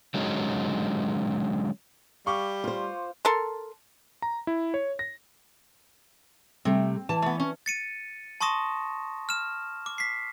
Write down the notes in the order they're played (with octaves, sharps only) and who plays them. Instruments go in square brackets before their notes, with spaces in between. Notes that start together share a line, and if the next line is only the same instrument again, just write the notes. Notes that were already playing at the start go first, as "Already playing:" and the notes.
[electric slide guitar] D3 F#3 G#3 C#4 D#4
[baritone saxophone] G3 [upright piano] F5 C#6 D6
[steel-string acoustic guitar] F4 C5
[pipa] A4 A#4 C6
[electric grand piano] A#5
E4
C#5
A#6
[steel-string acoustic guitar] C3 G3 A3 [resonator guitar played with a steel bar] C4
[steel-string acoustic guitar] E3 [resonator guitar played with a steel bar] A5
[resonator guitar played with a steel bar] A3 B3
C#4
[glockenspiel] A6 C#7 D#7
A5 C6 C#6 D#6 A#6 E7
F6 E7
D6
B6 C7